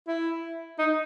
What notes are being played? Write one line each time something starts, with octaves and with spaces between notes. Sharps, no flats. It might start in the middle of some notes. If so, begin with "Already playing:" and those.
E4
D#4